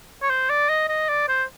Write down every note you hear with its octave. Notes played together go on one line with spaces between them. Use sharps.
C#5
C5
D5
D#5
D#5
D5
C5